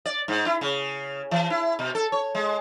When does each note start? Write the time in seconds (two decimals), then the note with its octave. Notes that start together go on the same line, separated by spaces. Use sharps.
0.05 D5
0.28 G#2
0.46 E4
0.61 C#3
1.31 E3
1.50 E4
1.79 B2
1.95 A4
2.12 C#5
2.35 G#3